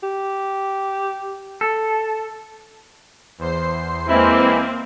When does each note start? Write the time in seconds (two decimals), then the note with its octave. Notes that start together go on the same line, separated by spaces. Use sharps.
0.03 G4
1.61 A4
3.38 E2 C5 C7
4.08 E3 G#3 A#3 C4 E4